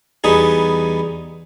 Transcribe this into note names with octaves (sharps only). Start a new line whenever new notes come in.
E2 G3 B3 D#4 G#4